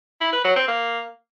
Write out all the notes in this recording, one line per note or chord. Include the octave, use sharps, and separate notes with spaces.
E4
B4
F#3
C4
A#3